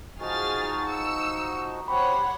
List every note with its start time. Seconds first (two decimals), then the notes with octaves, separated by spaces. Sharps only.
0.20 F3 D#4 F#4 G#4 F6 A6
0.87 E6 C#7
1.88 C4 F#4 G4 C5 C#5 F#5 B5